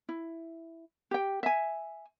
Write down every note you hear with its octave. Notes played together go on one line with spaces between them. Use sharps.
E4
G4 G5
E5 G#5